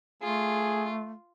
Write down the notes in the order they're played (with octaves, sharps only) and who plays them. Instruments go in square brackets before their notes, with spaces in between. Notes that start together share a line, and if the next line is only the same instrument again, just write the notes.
[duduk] A3 [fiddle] F4 [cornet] G#4